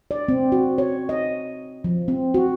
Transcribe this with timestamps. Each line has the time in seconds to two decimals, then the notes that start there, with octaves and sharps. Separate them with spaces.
0.11 D5
0.29 C4
0.52 F#4
0.78 C#5
1.09 D#5
1.84 F3
2.08 C4
2.34 F#4